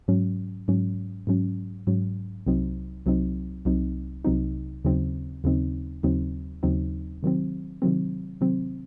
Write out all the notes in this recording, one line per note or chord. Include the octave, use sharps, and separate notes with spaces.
G#2 F#3 C#4
G#2 F#3 C#4
G#2 F#3 C#4
G#2 F#3 C#4
C2 C3 F#3 C4 D#4
C2 C3 F#3 C4 D#4
C2 C3 F#3 C4 D#4
C2 C3 F#3 C4 D#4
D#2 C#3 F#3 C4 D#4
D#2 C#3 F#3 C4 D#4
D#2 C#3 F#3 C4 D#4
D#2 C#3 F#3 C4 D#4
C3 D#3 F#3 C4
C3 D#3 F#3 C4
C3 D#3 F#3 C4